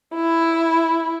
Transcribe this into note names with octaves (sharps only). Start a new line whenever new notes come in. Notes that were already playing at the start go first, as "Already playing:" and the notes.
E4